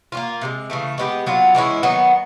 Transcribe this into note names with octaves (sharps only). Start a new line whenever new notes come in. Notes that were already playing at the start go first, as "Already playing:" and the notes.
A#3 C#4 F4
C3 D#3 G#3
C#3 E3 A3
G#3 B3 E4 G4
F#3 B3 D4 F4
E3 G#3 C#4 E4
D#3 F#3 B3